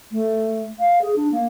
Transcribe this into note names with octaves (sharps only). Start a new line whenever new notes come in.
A3
F5
G#4
D4
A#3